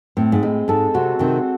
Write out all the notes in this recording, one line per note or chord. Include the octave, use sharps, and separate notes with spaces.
A2 C4
G#2
A2 G#3
G#2 A4
C3 F#4
C3 D#3 C4